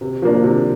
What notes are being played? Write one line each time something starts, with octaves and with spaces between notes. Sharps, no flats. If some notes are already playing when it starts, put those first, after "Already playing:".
C3
F3 A#3 D4
C3